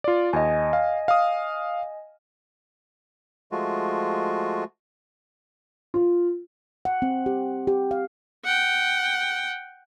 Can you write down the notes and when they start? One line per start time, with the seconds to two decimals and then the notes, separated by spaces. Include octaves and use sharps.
0.04 F4 D5
0.33 D#2 D#5 G#5
0.73 F5
1.08 F5 D#6
3.52 F3 G#3 A3 F4 F#4
5.94 F4
6.85 F#5
7.02 C4
7.26 G4
7.67 G4
7.91 F5
8.45 F#5 G5